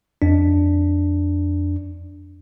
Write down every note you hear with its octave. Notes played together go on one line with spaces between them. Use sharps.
F2 D4